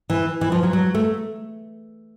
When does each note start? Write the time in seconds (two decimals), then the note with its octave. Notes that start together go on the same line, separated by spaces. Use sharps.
0.10 E3
0.41 E3
0.52 F3
0.63 F#3
0.73 F#3
0.95 A3